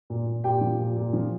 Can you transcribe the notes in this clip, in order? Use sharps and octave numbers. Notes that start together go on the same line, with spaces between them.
A#2
A#2
A#2 G4 G5
F3
A#2
A#2
F3